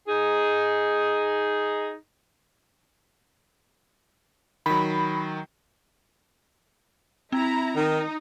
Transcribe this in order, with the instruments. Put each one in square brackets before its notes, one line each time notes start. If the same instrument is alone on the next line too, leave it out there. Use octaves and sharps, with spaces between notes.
[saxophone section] D#4 G#4
[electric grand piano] D#3 F#3 [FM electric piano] B5
[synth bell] C4 [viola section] E4 A#5
[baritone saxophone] D#3 [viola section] D#4